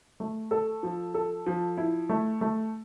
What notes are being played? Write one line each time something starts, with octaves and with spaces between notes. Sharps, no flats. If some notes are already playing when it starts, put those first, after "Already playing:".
A3
A4
F3
A4
F3
E4
A3
A3